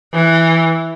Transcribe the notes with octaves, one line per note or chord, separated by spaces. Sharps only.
E3